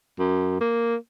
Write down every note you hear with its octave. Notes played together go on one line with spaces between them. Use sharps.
F#2
A#3